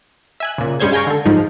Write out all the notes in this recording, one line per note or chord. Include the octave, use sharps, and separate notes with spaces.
E5 G#5 F#6
A#2 C#3
G2 G3 G#3 C#4 C5 G#6
F5 G5 G#5 A#5 C#6
D3 A4
G#2 F3 G#3 D#4